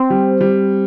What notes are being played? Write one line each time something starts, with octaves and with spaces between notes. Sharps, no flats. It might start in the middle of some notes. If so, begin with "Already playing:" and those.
Already playing: C4
G3
G3